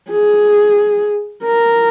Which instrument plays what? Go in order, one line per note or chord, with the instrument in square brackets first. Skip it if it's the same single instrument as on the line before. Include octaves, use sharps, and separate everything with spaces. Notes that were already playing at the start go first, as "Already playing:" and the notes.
[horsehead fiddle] G#4
A#4